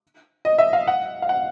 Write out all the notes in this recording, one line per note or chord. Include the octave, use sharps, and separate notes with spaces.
D#5
E5
F5
F#5
F5
F#5